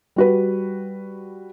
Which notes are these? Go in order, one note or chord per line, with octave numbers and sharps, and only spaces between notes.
G3 F#4 B4